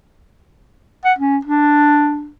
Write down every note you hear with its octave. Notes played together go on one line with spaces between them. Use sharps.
F#5
C#4
D4